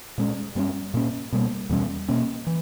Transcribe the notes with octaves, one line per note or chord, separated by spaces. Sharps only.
A#2 G#3 C#4
G2 G3 A#3 C#4
A#2 A#3 C#4
B2 G3 A#3
E2 B2 G3 C#4
B2 A#3 C#4
E3